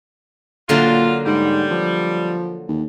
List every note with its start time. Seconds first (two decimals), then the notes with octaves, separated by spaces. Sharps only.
0.69 A#2 D3 F#3 A#3 F4
1.26 G#2 G3
1.71 F3
2.68 D#2